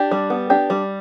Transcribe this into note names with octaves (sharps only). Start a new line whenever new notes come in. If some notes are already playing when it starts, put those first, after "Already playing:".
Already playing: D4 G4
G3
B3
D4 G4
G3